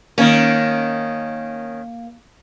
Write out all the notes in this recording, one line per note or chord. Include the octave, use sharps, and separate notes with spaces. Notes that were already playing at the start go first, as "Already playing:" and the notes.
D#3 A#3 C#4